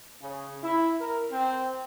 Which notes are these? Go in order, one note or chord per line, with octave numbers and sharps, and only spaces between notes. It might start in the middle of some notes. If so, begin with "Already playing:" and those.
C#3
E4
A#4
C4